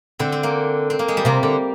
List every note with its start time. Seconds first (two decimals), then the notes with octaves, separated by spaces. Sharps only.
0.19 D3 C4
0.32 C4
0.43 A#3
0.90 C4
0.99 A#3
1.08 G#3
1.17 G3
1.25 C3 A#3
1.43 D3